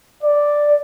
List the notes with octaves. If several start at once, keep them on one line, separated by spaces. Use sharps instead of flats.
D5